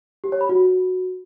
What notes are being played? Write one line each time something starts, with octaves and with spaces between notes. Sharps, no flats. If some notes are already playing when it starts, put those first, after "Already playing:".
G4
C#5
B5
F#4